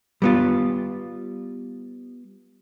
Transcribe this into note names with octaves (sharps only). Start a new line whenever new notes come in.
G3 B3 F4